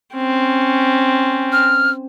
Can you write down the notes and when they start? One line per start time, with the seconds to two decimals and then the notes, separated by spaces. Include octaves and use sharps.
0.15 C4 C#4
1.52 F6